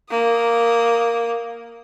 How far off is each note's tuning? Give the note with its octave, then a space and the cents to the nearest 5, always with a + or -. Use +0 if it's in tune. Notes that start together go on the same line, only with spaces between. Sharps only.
A#3 +0 D#6 +0